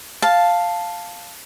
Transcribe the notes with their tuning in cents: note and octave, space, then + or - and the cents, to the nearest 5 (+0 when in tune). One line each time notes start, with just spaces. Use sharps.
F5 +0 A5 +0